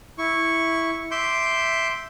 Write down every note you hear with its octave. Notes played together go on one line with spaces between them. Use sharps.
E4 C#6
E5 C6 D6 G6